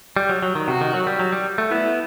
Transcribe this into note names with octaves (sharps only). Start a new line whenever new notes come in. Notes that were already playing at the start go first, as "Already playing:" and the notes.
G3
F#3
F#3
D#3
C3 F#4
D#3
F#3
G3
F#3
G3
A3
B3 E4